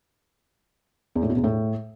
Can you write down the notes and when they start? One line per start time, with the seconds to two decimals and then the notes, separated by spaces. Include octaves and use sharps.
1.15 E2
1.23 A2
1.30 B2
1.37 E2
1.44 A2